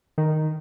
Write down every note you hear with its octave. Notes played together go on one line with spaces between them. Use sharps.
D#3